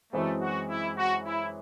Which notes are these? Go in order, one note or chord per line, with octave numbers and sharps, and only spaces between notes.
F#2 E3 G#3 A3 C4
F#4
E4
F#4
E4